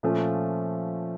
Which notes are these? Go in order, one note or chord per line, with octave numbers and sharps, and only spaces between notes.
A#2 F3 A3 C#4